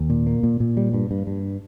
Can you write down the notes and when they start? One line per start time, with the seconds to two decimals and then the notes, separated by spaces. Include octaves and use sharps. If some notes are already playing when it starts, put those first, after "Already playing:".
Already playing: D#2
0.10 A#2
0.27 A#3
0.43 A#2
0.60 A#2
0.77 G3
0.94 G2
1.11 G2
1.27 G2